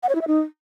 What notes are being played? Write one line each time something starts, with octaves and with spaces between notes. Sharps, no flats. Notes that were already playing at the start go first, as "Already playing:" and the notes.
F#5
C#5
E4
E5
D#4